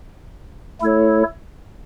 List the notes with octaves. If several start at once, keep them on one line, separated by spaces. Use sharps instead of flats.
A3 E4 A4 C#5